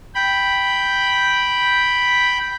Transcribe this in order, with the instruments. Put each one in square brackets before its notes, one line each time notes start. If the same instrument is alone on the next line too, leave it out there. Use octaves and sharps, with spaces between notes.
[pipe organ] G5 B5